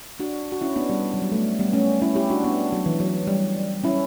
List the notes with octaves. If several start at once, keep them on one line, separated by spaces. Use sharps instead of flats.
D4 F#4
F#4
C#4 E4
B3 D4
G3 B3
F#3
G3
A3
G3 B3
A3 C#4
C#4 E4
E4 G4
D4 F#4
B3 D4
F#3
E3
F#3
G3
C#4 E4